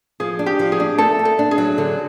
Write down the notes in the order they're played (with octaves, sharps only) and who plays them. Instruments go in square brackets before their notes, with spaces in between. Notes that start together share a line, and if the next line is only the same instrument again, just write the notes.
[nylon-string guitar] F3 [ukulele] G#4
[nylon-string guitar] D4
[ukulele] G4
[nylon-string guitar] F3
[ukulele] G#4
[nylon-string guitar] D4
[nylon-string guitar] A3 [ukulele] A4
[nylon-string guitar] A3
[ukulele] A4
[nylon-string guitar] D4
[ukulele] G#4
[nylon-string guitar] F#3
D3